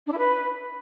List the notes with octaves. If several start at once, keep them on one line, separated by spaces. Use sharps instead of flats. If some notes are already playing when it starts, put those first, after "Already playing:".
D4
E4
B4